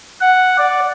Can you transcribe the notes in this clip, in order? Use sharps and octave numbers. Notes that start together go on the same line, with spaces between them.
F#5
D5